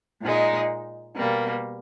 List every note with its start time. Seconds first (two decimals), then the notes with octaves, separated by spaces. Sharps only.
0.22 A#2 G#3 D#4
1.16 B2 G3 A#3